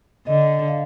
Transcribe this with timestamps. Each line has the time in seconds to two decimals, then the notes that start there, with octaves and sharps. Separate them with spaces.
0.27 D3 D#5
0.68 F5